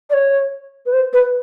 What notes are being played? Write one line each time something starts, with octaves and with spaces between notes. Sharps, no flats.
D5
C#5
B4
C5
B4